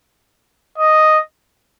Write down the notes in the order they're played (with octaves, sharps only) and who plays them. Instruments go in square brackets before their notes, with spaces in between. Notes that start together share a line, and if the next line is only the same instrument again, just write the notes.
[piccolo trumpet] D#5